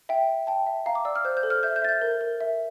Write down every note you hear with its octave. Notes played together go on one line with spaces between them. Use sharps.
E5 G5
E5
G5 A5
E5
F5 A#5
D6
D5 E6
F6
C5 G6
G6
A4
F6
E5 G6
G6
E5 A6
G6
A#4
A#4
E5